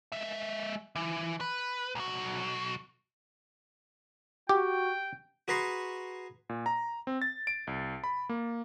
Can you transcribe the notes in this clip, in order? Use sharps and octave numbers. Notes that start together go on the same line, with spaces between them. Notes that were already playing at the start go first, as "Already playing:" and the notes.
G#3 E5
E3
B4
B1 F#4
F#4 G4 G5
F#4 G#4 B4 A#5 C6 C#6
A#2
A#5
C4
A6
D7
C2
B5
A#3